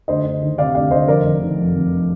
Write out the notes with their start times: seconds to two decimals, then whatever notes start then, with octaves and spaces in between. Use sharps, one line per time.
0.08 D2 C5 D#5
0.25 D2
0.42 D#3
0.58 C3 D5 F5
0.75 D2 D5 F5
0.91 D2 C5 D#5
1.08 F1 A#4 D5
1.24 F1
1.41 D#3
1.59 F2
1.75 F1